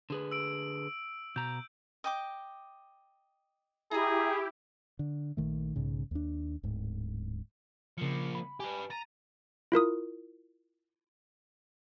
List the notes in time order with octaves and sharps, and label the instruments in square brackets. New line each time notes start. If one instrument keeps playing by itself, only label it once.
[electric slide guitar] D3 G#4 B4
[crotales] E6 D7
[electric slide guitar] B2 A#5 [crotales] G6
[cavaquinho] D#5 G5 D6
[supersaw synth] E4 G4 [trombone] G#4 [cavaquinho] D#5 A#5
[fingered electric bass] D3
A#1 D#3 A3
B1 G#2 C#3
D#2 D4
D1 G#2
[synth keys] C#3 C#7 [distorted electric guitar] F3 A#3
[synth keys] B5
[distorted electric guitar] G4 B4 [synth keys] G#5
[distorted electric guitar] A#5 [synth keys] A6 D#7
[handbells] E4 F4 A#4 D#6